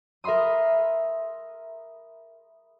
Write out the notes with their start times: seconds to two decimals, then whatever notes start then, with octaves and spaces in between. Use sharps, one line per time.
0.24 A#4 E5 B5 C6 D#6